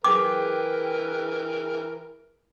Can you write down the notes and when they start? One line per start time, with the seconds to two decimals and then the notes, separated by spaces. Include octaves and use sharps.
0.04 E3 G#4 A#4 B4 G5 D6